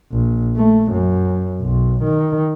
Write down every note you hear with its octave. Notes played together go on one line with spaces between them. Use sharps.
A#1
A3
F#2
B1
D#3